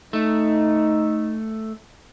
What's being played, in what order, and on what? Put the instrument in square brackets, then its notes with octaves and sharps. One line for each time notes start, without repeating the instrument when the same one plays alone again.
[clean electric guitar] A3 [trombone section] D#4